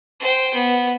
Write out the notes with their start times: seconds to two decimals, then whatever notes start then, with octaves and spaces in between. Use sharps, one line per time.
0.20 C5 G5
0.54 B3